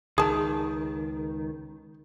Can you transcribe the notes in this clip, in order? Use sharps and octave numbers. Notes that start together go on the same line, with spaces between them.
C#2 D#3 G#4 A5